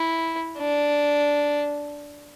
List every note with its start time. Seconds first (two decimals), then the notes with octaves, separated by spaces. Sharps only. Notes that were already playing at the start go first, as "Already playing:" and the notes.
Already playing: E4
0.59 D4